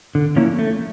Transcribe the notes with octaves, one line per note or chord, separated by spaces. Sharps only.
D3
F3 A#3 C#4 E4
A3